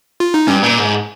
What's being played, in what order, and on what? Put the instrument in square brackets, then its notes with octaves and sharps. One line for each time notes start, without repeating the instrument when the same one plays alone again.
[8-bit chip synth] F4
D#4
[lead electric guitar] G2 [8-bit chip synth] C#4
[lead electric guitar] A#2
G#2